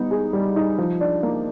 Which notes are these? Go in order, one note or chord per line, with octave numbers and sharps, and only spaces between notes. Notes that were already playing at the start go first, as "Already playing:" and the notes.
Already playing: G3 B3 D#4
G#4
G3
D#4
F3
D4
A#3